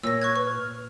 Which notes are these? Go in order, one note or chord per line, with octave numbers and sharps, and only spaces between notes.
A#2 C#5 E6 A#6
C#6 F#6 G#6
B4 C#6
F6